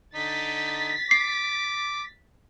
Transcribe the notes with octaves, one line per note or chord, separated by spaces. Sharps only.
D3 D#4 A6 B6
D6 C7